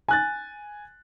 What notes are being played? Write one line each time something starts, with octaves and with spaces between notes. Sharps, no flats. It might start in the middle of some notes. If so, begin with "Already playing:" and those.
G#5 F#6 A6